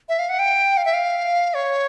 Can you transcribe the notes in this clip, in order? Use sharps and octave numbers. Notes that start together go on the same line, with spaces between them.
E5
F5
F#5
G5
F5
E5
F5
C#5